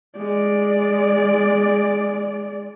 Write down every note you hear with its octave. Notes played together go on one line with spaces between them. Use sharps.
G#3 D5